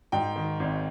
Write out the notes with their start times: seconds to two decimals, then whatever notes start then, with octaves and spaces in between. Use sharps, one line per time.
0.12 G#2 G5
0.36 D#3
0.60 G#1